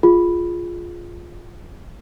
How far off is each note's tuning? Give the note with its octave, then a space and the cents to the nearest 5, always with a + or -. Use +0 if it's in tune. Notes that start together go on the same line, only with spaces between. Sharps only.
F4 +0 G#4 +0